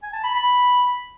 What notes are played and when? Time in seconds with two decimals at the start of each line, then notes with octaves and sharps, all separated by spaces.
0.02 G#5
0.13 A5
0.23 B5
0.34 B5